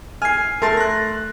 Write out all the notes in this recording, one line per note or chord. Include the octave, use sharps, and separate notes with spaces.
G#5 F6 C7
A3 A#4 C6 A6
F#6 A#6